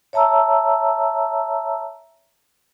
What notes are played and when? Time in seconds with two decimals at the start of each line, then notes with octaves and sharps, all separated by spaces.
0.13 C#5 E5 A5 A#5 E6